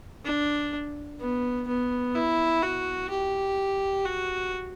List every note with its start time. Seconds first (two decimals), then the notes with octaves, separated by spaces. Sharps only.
0.25 D4
1.20 B3
1.67 B3
2.15 E4
2.63 F#4
3.10 G4
4.05 F#4